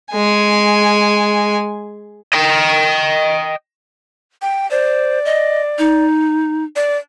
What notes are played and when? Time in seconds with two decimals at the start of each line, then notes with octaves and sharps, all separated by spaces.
0.12 G#3 G#5
2.34 D#5 G5
4.42 G5
4.71 C5 D5
5.25 D#5
5.78 D#4
6.76 D5